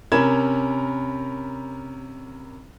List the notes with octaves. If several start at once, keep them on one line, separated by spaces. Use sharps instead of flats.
C3 C#4 A#4 B5 G#6 E7